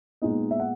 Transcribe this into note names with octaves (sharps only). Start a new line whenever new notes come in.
A#2 G#3 B3 D#4 D#5
E5
F#5